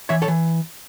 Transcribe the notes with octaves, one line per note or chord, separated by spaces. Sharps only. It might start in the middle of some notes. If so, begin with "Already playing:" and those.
E3 C#5 E5
A4 C#5
E3